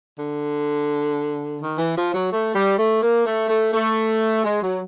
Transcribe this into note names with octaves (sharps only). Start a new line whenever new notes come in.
D3
D#3
E3
F3
F#3
A3
G3
A3
A#3
A3
A3
A3
G#3
F#3